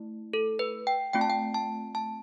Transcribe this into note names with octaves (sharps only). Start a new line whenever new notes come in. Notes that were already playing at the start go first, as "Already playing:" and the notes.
Already playing: A3 E4
A4
B4
G5
A3 C4 F4 G5
A5
G5
A5
A5